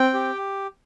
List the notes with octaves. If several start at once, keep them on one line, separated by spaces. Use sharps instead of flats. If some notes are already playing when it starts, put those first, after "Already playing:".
Already playing: C4 G5
G4